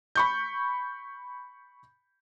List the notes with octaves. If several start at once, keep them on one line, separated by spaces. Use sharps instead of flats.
B5 C#6 G6